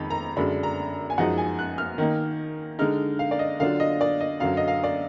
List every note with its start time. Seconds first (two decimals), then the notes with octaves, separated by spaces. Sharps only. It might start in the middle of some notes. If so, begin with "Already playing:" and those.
Already playing: F2 D#3 G#3 D#4 B5
0.10 A#5
0.37 F#2 D3 G#3 D4 B5
0.63 A#5
1.10 G#5
1.18 F#2 F3 G#3 D#4 F#5
1.38 G#5
1.59 F#6
1.78 F6
1.98 D#3 A#3 D#4
2.79 D3 G#3 D#4 F6
3.19 F5
3.31 D5
3.39 D#5
3.60 D3 F#3 D4 F4 F5
3.80 D#5
4.01 D5
4.21 D#5
4.40 F#2 D3 F#3 F5
4.57 D#5
4.68 F5
4.84 D5